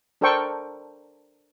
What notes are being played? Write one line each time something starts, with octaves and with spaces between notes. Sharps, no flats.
D4 A4 A#4 C5 G5 C#6